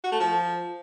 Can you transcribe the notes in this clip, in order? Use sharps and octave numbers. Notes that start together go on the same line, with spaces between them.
F#4
A3
F3